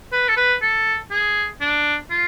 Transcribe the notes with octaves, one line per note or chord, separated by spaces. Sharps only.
B4
A4
B4
A4
G#4
D4
F4